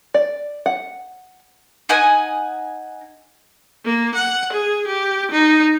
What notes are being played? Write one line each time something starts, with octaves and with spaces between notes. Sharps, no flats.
D5
F#5
D#4 F#5 G#5 D#6
A#3
F#5
G#4
G4
D#4